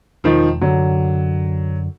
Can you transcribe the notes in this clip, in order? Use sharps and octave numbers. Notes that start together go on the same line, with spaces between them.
E1 D#3 F3
F#2 D3 F#3